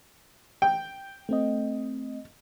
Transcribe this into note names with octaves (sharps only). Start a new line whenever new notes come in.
G5
A3 C4 D#5